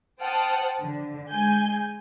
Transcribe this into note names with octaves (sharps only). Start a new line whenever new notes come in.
C5 F#5 G5 A5 D#6 F6
D3
G#3 G#5 G6